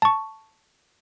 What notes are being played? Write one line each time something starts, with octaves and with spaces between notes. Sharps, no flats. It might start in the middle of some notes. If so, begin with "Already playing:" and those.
A5 C#6